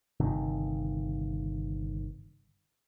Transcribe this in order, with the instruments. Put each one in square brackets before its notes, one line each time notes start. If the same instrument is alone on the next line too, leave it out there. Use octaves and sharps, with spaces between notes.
[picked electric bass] G1 C3 D#3